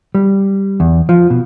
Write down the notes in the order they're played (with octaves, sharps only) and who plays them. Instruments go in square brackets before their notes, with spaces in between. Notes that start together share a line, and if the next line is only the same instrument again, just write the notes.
[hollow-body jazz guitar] G3
E2
F3
B2